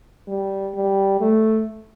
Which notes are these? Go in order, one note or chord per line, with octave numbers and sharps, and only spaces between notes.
G3
G3
A3